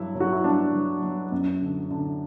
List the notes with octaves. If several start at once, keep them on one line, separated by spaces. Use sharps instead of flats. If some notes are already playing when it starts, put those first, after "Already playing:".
Already playing: G2 F#3 E4
F#3
F#4
E4
G2 D4
F#3
F#3
F#2
D3
D3